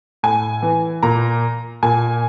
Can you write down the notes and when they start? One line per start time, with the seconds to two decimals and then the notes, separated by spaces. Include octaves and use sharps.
0.23 A2 G#5
0.62 E3
1.03 A#2 A#5
1.83 A#2 G#5